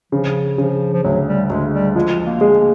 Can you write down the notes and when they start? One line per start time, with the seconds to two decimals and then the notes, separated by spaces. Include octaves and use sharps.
0.12 C#3 F3
0.58 C#3 F3
0.93 F3
1.04 D2 F#3
1.27 G3
1.50 D2 G#3
1.73 G3
1.95 F3 G#3
2.26 A#3
2.41 G#3
2.57 A#3